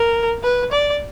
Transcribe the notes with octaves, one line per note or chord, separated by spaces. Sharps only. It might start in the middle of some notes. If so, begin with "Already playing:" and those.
Already playing: A#4
B4
D5